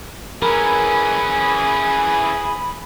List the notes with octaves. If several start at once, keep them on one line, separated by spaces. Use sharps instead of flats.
E3 C#4 G#4 A#4 B5